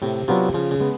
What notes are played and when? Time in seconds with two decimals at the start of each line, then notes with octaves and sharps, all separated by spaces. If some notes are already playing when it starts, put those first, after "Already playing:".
0.02 A2 C3
0.28 C3 F#3 B3 D4 F4
0.54 C#3 F3
0.71 C#3
0.80 G#3 B3